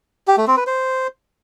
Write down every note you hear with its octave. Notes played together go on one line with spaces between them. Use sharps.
G4
A3
C4
B4
C5